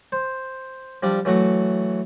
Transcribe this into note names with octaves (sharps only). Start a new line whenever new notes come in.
C5
F3 G3 D4
E3 F#3 A3 F#4